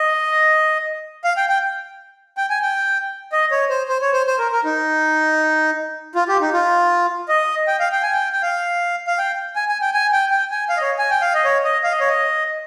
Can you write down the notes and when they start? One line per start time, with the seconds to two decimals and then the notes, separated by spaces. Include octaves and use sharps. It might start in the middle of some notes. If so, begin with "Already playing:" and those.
Already playing: D#5
1.24 F5
1.37 G5
1.49 G5
2.37 G5
2.50 G#5
2.62 G5
3.32 D#5
3.51 C#5
3.69 C5
3.89 C5
4.02 C#5
4.13 C5
4.27 C5
4.39 A#4
4.52 A#4
4.65 D#4
6.15 F4
6.28 G4
6.41 D#4
6.53 F4
7.28 D#5
7.67 G5
7.80 F5
7.92 G5
8.03 G#5
8.13 G5
8.33 G5
8.43 F5
9.07 F5
9.18 G5
9.56 G#5
9.69 G#5
9.81 G5
9.94 G#5
10.12 G5
10.31 G5
10.51 G#5
10.69 F5
10.77 D#5
10.82 C#5
10.99 G#5
11.10 G5
11.21 F5
11.34 D#5
11.45 C#5
11.64 D#5
11.84 F5
11.91 D#5
12.00 C#5
12.09 D#5